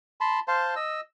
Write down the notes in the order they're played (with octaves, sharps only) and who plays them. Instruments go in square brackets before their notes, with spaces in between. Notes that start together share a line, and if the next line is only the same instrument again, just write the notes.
[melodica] A5 B5 C6
C5 F5 A5 C6
D#5 E6